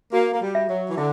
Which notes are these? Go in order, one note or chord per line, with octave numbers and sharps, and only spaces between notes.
A#3 F#4
A#3
G3
E5
F#3
E3
D3 E4